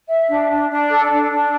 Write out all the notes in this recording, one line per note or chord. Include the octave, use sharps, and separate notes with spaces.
E5
D4
D4
D4
A4
D4
D4